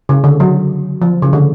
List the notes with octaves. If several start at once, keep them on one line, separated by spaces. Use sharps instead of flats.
C#3
D3
F#3
F3
C#3
D3